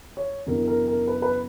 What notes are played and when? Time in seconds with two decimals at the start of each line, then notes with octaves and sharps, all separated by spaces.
0.17 C#5
0.47 F#2 C#3 E3 B3 D4 A#4
0.67 A#4
0.88 A#4
1.07 B4
1.22 B4